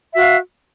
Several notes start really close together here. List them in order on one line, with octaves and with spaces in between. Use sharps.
E5 F#4 F5